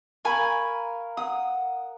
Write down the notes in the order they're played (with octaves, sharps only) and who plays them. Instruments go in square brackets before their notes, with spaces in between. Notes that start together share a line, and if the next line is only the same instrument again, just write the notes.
[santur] A#4 F5 [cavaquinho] G#5 B5 C#6
[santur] F#5 [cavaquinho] D#6